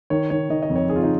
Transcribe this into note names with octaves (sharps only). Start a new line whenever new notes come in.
D#3 C#5
D#3 C#5
D#3 D#5
D#5
F2
C#5
D#3 G#4
F4
D#4